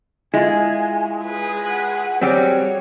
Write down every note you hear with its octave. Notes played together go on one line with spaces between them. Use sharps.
G#3 E4 F4 G#5
G#4 B4
F#5
F#3 G3 C4 G#4 C#5